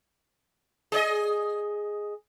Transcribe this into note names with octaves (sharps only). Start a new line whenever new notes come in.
G#4 D5 D#5